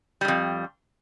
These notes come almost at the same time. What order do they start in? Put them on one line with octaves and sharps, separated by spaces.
G3 G#2 F2